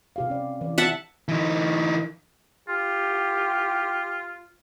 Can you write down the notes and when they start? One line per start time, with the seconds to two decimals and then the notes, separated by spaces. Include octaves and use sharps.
0.16 C3 G4 F5
0.30 C#4 D5
0.61 E3 D5
0.78 E5 F#5 A5
1.28 E3 D#4
2.68 F4 G4